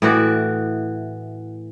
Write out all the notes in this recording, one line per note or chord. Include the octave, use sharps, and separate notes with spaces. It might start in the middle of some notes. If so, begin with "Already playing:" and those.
A2 E3 F#4 D5